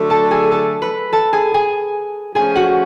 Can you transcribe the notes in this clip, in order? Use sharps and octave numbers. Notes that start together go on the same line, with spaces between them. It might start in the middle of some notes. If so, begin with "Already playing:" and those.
Already playing: D3 F#3 A3
A4 A5
G#4 G#5
A4 A5
B4 B5
A4 A5
G#4 G#5
G#4 G#5
F3 A3 C#4 G#4 G#5
F#4 F#5